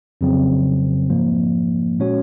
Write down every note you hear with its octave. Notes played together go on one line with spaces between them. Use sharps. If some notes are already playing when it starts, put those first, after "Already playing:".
F2 C#3 F#3 C4
G#2 F3 A#3
A#2 G#3 C#4 F#4 C#5